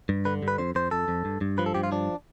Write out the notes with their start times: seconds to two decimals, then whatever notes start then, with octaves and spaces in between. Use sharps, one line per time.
0.09 G2
0.25 D3 B4
0.43 G2
0.48 B4
0.58 F2 C5
0.75 F2 C5
0.91 F2 A4
1.08 F2
1.25 G2
1.41 G2
1.58 F3 B4
1.66 A4
1.74 G2 G4
1.83 F4
1.92 F3 D4